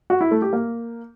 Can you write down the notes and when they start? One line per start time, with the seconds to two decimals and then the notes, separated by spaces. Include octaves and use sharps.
0.10 F#4
0.21 E4
0.31 A3
0.42 G4
0.53 A#3